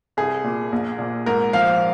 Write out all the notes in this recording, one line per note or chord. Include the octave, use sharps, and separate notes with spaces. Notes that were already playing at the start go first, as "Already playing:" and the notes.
C2 G#4
A#2
A#1
A#2
G#2 A#4
F3 F5